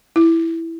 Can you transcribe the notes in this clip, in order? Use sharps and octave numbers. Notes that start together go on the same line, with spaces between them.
E4